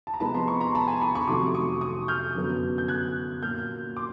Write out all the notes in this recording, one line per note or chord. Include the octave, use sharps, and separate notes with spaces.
A5
A#5
C3 F3 G#3 B3 A5 B5
A#5 C6
B5 C#6
A#5 C6
A5 B5
G#5 A#5
B5 C#6
B5 C#6
F2 C3 D#3 F#3 A3 C6 D6
C#6 D#6
C#6 D#6
F6 G6
F#2 D3 F#3 B3
G6
F#6 G#6
A#2 F#3 A#3 F6 G6
C6 D6